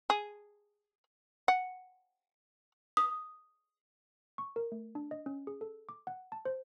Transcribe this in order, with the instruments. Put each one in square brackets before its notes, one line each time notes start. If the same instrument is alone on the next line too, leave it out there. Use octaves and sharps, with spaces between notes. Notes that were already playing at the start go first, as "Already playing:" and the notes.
[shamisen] G#4
F#5
[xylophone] D#6
[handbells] C#6
A#4
A3
D4
D#5
C#4
G#4
A4
D6
F#5
A5
C5